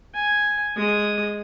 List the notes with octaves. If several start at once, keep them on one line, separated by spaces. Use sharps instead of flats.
G#5
G#3 D#6